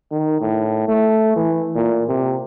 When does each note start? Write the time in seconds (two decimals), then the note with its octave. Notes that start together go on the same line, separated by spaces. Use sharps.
0.11 D#3
0.41 A2
0.88 A3
1.36 E3
1.75 A#2
2.08 C3